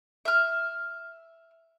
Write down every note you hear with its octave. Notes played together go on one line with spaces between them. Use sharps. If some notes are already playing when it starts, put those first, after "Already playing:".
E5 F6